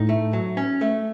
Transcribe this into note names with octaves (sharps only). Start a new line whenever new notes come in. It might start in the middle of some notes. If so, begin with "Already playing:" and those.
Already playing: A2 D#4
A3
F#3
C#4
A3